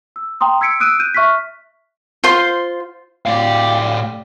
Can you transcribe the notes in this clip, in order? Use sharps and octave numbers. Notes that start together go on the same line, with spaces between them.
E6
G5 A#5 C6 D#6
E6 G#6 B6 C#7 D7
D#6 E6 F#6 D7 D#7
F#6 G6 D#7
E5 C#6 F6 F#6 B6
F4 C5 C6
A2 G4 D5 F5